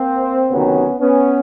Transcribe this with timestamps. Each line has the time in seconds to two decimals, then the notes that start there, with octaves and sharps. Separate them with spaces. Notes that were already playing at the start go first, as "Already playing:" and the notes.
Already playing: A#3 C4
0.50 D2 C3 D#3 F#3 B3 C#4
1.00 B3 C#4